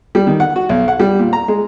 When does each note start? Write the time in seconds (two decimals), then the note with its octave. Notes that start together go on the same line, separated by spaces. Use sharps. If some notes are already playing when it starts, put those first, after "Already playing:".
0.15 G3
0.27 D#3
0.40 F#5
0.56 F#4
0.69 B1
0.88 F#5
1.00 G3
1.19 A#2
1.33 A#5
1.48 G#3